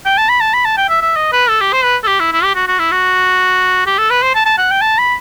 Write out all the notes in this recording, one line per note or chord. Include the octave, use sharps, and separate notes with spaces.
G5
A5
B5
A5
B5
A5
G5
E5
E5
D#5
B4
A4
G4
C5
B4
A4
G4
E4
E4
G4
F#4
F#4
E4
F#4
G4
A4
B4
C5
A5
A5
F#5
G5
A5
B5